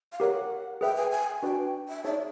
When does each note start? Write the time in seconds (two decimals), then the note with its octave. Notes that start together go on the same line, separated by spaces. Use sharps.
0.12 F5
0.20 G4 A#4 C#5 F#5
0.81 G#4 B4 E5 G5
0.96 G#5
1.11 G#5
1.43 D4 F#4 B4 D5 G5
1.88 E5
2.04 D#4 G#4 C#5 D5 E5 A5